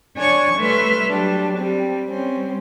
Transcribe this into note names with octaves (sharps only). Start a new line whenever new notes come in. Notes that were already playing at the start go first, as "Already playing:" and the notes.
D4 C#5 G#5 C#6
G3 A3 B4 E5 C6 F6
F#3 G3 D4
G3 C4
G3 C4 C#4